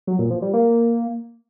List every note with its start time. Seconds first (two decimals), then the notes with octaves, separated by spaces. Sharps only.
0.07 F#3
0.19 A#2
0.30 F3
0.42 G3
0.54 A#3